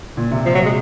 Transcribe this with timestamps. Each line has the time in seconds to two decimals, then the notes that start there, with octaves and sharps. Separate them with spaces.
0.17 A#2
0.31 C3
0.46 F3
0.55 F#3
0.65 G#3